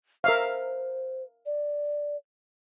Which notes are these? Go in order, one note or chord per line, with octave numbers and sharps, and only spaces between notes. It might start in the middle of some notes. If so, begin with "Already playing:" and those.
A#4 C5 E5 F5
D5